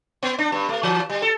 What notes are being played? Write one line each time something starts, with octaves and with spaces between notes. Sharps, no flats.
B3
D4
G2
A3
E3
G3
A4